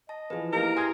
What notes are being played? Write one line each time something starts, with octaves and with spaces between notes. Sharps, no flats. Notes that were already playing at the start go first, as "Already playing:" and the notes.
D#5 A5
E3 F3 G#4 B4
A#3 D#4 E4 G4 A#4 A#5
G#5 C6 D#6 F6 G#6 A#6